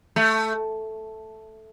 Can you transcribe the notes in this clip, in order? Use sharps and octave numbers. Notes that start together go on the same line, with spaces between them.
A3